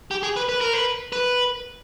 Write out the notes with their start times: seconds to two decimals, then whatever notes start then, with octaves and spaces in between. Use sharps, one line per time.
0.11 G4
0.23 G#4
0.36 B4
0.49 B4
0.61 A#4
0.73 B4
1.12 B4